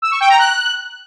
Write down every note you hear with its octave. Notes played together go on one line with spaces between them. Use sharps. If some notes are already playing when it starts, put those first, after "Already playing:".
E6
C#6
G5
A#5
F#6